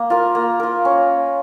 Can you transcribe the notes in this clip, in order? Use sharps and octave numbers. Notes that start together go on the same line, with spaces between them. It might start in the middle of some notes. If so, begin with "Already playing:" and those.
Already playing: A#3
F4 A#4
A#3
F4 A#4
C#4